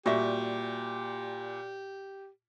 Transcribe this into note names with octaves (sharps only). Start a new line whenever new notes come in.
A#2 G3 F#4 G4 E5